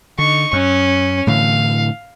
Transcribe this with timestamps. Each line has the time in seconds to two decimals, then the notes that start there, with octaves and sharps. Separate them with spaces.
0.19 D3 D#4 C#6
0.53 F#2 C#4
1.27 A2 D3 E3 F5